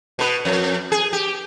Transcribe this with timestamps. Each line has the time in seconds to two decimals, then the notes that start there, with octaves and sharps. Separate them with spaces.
0.19 B2 B4
0.45 F2
0.92 G#4
1.13 G4